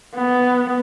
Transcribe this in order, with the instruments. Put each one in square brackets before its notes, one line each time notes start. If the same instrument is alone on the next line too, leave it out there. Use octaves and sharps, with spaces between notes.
[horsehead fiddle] B3